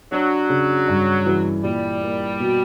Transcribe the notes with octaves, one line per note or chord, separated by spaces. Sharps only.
F#3 D4
C#3
G2
E3
A#2 G3
A#3
B2